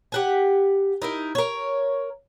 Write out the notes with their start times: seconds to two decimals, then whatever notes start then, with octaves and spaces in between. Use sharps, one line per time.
0.12 G4 F#5 G#5
1.02 D#4 E4 A#4
1.35 A#4 C#5